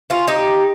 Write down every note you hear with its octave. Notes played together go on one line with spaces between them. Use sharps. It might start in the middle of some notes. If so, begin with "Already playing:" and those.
C#4 F4
D#4 G4